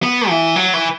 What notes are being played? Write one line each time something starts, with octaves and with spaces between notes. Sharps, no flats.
B3
E3
F#3
E3